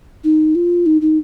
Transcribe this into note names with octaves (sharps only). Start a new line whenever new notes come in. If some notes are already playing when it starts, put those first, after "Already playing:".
D#4
F4
D#4
D#4